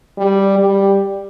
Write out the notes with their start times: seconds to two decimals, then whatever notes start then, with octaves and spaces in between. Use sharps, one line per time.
0.18 G3
0.59 G3